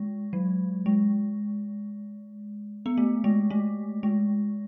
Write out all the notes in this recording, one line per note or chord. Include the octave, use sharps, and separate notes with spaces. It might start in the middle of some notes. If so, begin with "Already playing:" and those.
Already playing: G#3
F#3
G#3
B3
A3
G#3
A3
G#3